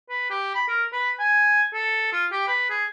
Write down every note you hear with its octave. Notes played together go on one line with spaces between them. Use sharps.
B4
G4
B5
A#4
B4
G#5
A4
F4
G4
B4
G#4